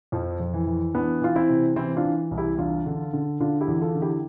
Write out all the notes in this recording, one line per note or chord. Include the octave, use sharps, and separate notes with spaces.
F2 F3
F2
E3
E3
E3 B3 D4
E3 F4
C4 E4
C3
E3 C4 E4
D4 F4
E3
C2
E4 G4
E2 D4 F4
D3
D3
D3 D4 F4
E4 G4
E2
F4 A4
D3
E4 G4